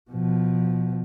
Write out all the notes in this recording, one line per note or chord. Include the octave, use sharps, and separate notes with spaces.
B2 F3